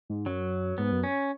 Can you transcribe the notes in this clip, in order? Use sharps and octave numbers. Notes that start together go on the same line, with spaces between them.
G#2
F#2 F#3
G#2 B3
F#2
C#4